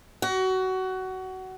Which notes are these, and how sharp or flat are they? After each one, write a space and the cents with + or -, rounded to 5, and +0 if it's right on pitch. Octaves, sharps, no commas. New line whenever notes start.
F#4 +20